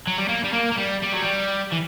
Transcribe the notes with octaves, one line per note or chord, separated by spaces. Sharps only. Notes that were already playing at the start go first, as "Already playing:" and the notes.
F#3
G3
A#3
G3
A#3
A#3
G3
G3
F#3
G3
E3